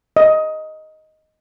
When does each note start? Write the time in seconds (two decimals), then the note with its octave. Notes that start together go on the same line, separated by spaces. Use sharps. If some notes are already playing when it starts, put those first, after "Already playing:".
0.17 D#5